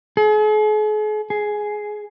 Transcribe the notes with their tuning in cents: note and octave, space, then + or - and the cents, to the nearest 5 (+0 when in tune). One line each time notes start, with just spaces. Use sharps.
G#4 +45
G#4 +10